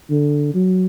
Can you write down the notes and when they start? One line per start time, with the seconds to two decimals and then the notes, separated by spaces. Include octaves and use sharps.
0.10 D3
0.54 F#3